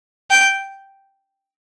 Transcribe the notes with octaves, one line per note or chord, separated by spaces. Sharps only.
G5